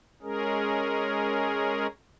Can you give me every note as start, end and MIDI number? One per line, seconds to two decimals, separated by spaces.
0.22 1.87 56
0.22 1.87 61
0.22 1.87 68
0.22 1.87 70